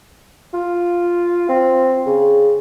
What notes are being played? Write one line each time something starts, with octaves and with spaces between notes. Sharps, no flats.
F4
C4
C#3